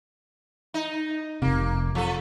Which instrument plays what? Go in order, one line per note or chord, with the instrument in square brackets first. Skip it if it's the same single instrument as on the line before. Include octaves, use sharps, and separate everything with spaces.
[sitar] D#4
[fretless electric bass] F1 C3 [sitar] A#3
[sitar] F3 A4